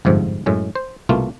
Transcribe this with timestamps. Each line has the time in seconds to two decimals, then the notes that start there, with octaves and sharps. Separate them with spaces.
0.05 G1 F2 G#2 C3 F3
0.46 F#2 A2 G#3
0.75 C5
1.09 C2 B2 A3 A#3 F4